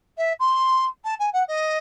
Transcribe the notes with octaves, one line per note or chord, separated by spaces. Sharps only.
E5
C6
A5
G#5
F#5
D#5